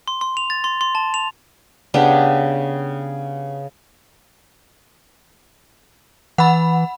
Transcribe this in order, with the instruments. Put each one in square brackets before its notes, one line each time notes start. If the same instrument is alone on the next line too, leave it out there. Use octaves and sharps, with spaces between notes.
[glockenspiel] C6
C6
F7
A6
C6
C6
A5
F7
[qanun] C#3 B3 D4 G4
[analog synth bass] E3 [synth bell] F#5 B5